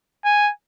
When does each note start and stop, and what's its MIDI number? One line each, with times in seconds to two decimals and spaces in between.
0.25 0.51 80